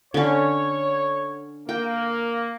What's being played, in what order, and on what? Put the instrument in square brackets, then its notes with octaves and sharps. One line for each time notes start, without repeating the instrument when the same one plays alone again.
[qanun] D3 C#4 [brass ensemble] C#5
[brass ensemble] A#3 [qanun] G5